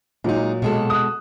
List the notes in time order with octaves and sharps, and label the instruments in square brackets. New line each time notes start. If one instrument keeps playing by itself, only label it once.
[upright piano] A#2 F#3 [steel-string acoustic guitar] G#3 D#4
[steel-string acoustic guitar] B2 G#3 A4
[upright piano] D#6 F#6